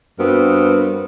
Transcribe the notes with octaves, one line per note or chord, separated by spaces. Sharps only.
G2 B3 C4 F#4 A#4